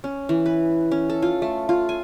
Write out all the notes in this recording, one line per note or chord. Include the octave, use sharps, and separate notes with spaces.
C#4
E3
B4
C#4
A4
F4
A3
F4
G#5